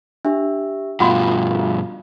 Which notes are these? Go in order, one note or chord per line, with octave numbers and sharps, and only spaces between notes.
D4 G4 E5
G2 B2 F4 F5 F#5 B5 C6